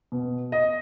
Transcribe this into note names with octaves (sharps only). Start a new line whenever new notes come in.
B2
D#5